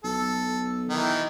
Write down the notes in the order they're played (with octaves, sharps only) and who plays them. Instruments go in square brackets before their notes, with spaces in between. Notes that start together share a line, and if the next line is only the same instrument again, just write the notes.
[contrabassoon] B1 [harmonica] A4
[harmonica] D#3 E3